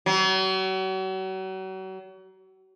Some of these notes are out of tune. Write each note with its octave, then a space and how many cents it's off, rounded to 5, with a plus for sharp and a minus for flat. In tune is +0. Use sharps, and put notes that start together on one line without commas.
F#3 +40